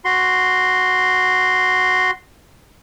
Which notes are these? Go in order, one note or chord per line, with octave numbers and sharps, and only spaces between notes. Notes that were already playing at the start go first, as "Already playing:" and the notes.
F#4 C6